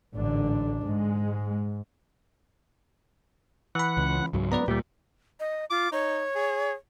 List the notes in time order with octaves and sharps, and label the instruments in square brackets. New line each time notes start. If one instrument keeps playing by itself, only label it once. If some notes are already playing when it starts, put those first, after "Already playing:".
[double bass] A1 D4 [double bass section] G#2 D3
[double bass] G#2 [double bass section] G#3
[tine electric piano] E3 B5 [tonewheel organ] F#5
[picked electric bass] C#2
C#2 G#2 F#3
[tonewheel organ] B3 [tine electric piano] B4 D5 A#5
[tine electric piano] D2 G3 [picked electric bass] A#2 [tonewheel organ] G4
[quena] D#5
[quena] F4 [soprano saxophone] D6
[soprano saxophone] D#4 [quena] C#5
[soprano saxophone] G#4